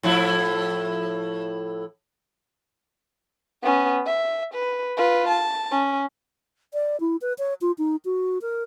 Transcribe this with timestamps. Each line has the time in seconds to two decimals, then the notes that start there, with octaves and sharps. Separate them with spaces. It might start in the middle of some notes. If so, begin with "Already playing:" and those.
0.03 A2 F3 E4
3.63 B3 C#4
4.06 E5
4.54 B4
4.97 F4 B4
5.28 A5
5.71 C#4
6.74 D5
7.00 E4
7.21 B4
7.38 C#5
7.61 F4
7.78 D#4
8.05 F#4
8.42 A#4